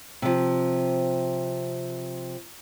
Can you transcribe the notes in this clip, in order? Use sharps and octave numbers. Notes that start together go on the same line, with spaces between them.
C3 F3